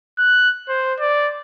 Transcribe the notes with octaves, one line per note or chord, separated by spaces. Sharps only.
F#6
C5
D5